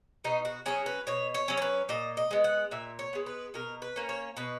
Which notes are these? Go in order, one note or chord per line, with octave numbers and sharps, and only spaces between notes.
B2 D#4
F#4
F#3 C#4 G#4
B4
B2 C#5
C#5
F#3 C#4
C#5
B4
A#2 D#5
D#5
G#3 B3
F#5
A#2 E5
C#5
G#3 B3
B4
B2 A#4
B4
A#3 C#4
C#5
B2 B4